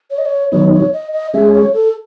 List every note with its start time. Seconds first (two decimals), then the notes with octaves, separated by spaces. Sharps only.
0.11 C#5
0.18 D#5
0.26 C#5
0.52 D#3 F#3 B3 D#4 C#5
0.72 C#5
0.93 D#5
1.13 D#5
1.34 G#3 C#4 G#4 E5
1.53 C#5
1.74 A4